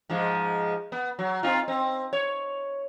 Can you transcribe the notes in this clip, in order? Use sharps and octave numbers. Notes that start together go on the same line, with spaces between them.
G#2 F3 G#3
B3
F#3
C4 D#4 F4
C4
C#5